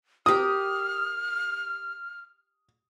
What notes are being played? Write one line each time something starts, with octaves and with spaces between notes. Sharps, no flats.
G4 A#4 D#6 F6